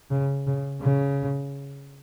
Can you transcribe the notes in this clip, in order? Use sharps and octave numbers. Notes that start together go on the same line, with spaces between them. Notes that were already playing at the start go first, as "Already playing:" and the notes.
C#3
C#3
C#3